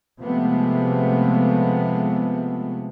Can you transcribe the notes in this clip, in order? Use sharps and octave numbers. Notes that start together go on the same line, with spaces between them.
C3 F3 G#3 A3 B3